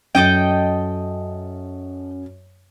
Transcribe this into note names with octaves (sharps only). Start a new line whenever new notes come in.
F#2 A4 D#5 G5